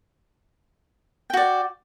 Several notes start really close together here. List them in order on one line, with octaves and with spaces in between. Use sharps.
G5 F#4 D5